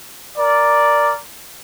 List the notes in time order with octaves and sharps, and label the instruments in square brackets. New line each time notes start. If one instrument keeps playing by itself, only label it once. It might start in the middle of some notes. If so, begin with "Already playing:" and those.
[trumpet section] A#4 D5